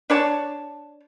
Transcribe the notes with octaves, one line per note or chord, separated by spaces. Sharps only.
D4 C#5 A5